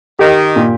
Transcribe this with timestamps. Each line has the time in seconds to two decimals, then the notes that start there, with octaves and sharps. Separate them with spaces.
0.19 D#3 G4
0.56 A#2